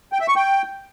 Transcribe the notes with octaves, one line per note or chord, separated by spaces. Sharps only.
G5
E5
C#6
G5